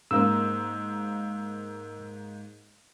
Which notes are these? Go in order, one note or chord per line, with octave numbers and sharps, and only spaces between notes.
G#2 A#3 E6